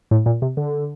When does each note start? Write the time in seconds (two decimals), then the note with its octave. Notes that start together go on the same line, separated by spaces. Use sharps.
0.11 A2
0.26 A#2
0.42 C3
0.57 D3